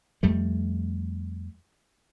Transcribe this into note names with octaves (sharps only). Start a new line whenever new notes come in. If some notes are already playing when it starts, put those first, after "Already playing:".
F2 G3 A3